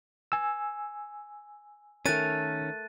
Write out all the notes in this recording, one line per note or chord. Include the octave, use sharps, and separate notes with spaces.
G#5 E6
D#3 A3 C#4 A#4 F#6 A6 D#7